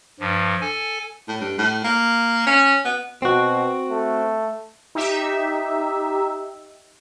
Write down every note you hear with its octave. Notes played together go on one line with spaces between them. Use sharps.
G2 F3
A4 G#5
A2
G2
A2
A#3
C#4
B3
B2 C4 F#4
A3
D#4 G4 E5